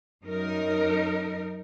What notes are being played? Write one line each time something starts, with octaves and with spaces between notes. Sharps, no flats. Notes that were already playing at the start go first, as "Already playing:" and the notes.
F#2 D#4 A#4